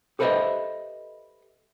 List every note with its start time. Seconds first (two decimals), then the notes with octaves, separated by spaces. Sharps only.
0.19 G4 A4 B4 C5 D#5 E5